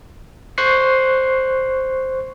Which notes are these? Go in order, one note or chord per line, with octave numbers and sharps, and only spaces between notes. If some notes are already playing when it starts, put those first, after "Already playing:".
C5 C#6 F#6 C7